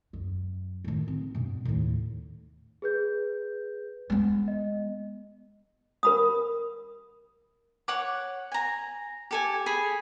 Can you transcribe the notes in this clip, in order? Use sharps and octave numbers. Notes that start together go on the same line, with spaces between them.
F#2
A2 D#3
C4
G2 B2
D#2 A2
G#4 B4 G6
G#3 B3
D#5
A#4 B5 D#6
C#5 F#5 D6
G#5 A#5
G4 A4 G#5
G#4 G#5 B5